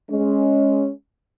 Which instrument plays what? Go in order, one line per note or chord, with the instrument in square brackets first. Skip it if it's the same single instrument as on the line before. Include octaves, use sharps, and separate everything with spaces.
[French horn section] G#3 C#4